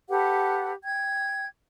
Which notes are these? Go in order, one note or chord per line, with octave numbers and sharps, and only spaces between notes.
G4 A4 B4 F#5
G5 G#6